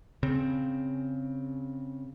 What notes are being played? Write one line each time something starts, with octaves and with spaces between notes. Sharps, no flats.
C#3 C4